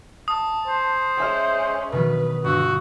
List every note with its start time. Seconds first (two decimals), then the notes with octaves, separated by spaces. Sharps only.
0.28 A5 D#6
0.68 C5
1.17 G#3 C#4 A4 E5 F6
1.92 B2 D#3 F#3 B4
2.44 G1 F#4 E6